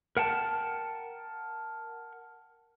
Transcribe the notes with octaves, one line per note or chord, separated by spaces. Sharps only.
A#4 F#5 G5 A5